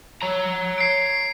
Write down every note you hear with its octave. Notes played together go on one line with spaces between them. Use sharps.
C#5 A#5
C7 D7